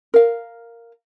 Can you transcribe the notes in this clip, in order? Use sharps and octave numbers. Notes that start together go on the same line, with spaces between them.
A#4 F5